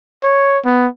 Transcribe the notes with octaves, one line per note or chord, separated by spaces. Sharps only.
C#5
B3